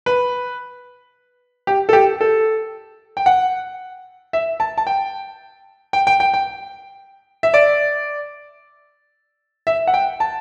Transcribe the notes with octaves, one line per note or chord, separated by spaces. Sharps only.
B4
G4
A4
G4
A4
G5
F#5
E5
A5
A5
G5
G5
G5
G5
G5
E5
D5
E5
F#5
G5
A5